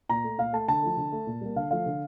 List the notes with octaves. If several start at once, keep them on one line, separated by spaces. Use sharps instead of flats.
A#2 A#5
A3
A#2 F5
A3 A5
D3 A5
F3 A3
D3
A3
A#2
G3 A#3
D3 F5
F3 A3 F5
D3